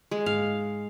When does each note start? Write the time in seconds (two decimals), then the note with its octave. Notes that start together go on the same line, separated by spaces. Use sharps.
0.11 G#3
0.26 G#2 F5